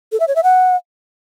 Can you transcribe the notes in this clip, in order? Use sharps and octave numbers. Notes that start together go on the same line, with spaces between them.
A4
E5
C#5
E5
F#5